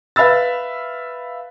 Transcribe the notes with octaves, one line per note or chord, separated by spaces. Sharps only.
B4 E5 F5 B5 E6 A6